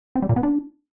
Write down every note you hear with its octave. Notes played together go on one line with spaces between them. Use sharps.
C4
G3
A#2
B3
D4